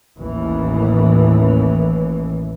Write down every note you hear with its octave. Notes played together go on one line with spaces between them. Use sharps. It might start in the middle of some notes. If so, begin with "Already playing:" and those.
A1 D#2 E3